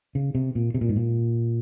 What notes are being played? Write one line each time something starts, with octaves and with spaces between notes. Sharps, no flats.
C#3
C3
A#2
C3
A#2
G#2
A#2